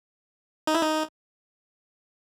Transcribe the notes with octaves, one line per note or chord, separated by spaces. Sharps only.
D#4
E4
D#4